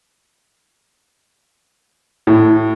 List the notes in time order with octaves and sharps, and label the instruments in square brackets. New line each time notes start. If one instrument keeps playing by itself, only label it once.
[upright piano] A2